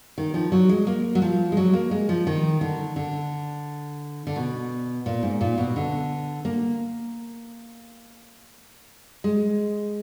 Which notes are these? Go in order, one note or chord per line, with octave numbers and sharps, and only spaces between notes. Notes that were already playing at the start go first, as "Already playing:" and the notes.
D#3
F3
F#3
G#3
A#3
F#3
F3
G#3
F#3
A#3
G#3
F3
D#3
D3
D3
D3
B2
A#2
G#2
A#2
B2
D3
A#3
G#3